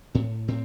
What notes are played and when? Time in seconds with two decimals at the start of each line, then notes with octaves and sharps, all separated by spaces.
0.15 A2 C4
0.48 A2 C4